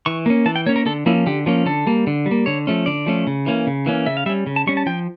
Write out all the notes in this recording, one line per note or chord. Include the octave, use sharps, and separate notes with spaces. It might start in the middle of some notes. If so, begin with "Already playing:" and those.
E3 C#6
A#3 C#4
E3 A5
G5
A#3 C#4 C#5
A#4
D3 A4
F3 A#3 C#4 E4
D3 G4
F3 A#3 C#4
D3 A4
G3 A#3
D3
G3
A#3
D3 C#5
F3 A3 C#4
D3 D5
F3 A3 C#4
C#3
E3 A#3 C#4
C#3
E3 A#3 C#4
C#3 E5
F5
G3 C#4 E5
C#3
A5
G3 C#4 C#6
A5
F3 G5